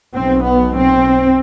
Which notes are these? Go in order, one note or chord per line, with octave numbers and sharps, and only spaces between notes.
B1 B2 C4
B3
C4